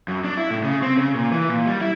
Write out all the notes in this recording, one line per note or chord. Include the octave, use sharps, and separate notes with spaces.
F#2
D4
E4
A2
C#3
C4
C#3
A#2
E3
A#2
G3
E4